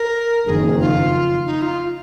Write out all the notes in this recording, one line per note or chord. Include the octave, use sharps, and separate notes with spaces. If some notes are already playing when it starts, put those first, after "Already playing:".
Already playing: A#4
F#1 F2 D#3 G#4
F4
D#4
F4